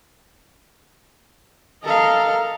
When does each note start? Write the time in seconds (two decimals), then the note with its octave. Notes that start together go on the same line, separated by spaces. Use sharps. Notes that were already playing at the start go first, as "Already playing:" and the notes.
1.83 A4 A#4 D#5 F5